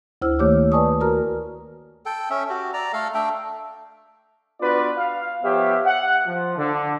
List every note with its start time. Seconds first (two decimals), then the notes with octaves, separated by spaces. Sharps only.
0.22 D2 E4 C5 E6 F6
0.39 D#3 A3 A#3 G4 C#5 D6
0.72 B4 D5 G#5 A5 C#6 D#6
1.00 F#4 A#4 A#5 F6
2.06 A4 G5
2.30 C#4 E5
2.49 F#4 G4
2.73 D5 A#5
2.93 A3 A4 F5
3.14 A3 D4 E5 G5
4.61 B3 D4 F4 F#4 B4 D5
4.96 F5
5.43 F3 B3 G4 C#5 E5 F5
5.85 F#5
6.26 F3
6.57 D3